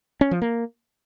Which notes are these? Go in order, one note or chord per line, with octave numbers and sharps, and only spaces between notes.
C#4
F3
A#3